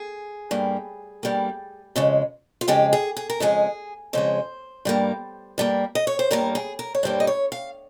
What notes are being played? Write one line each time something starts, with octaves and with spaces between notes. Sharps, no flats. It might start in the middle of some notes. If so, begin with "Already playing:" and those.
Already playing: G#4
G2 G3 A#3
G2 G3 A#3
F2 C#3 G#3
F4
F2 C#3 G#3 G4
G#4
G#4
A#4
F2 C#3 G#3 G#4
F2 C#3 G#3 C5
G2 G3 A#3
G2 G3 A#3
D#5
C#5
C5
G2 G3 A#3 A#4
G#4
A#4
C#5
G2 G3 A#3 C5
D#5
C#5
F5